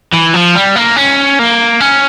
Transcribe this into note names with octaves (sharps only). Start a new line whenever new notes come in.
E3
F3
G3
A#3
C#4
A#3
C#4